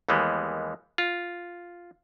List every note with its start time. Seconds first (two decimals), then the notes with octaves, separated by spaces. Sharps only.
0.09 D#2 E3 G3 G#3 B3
0.98 F4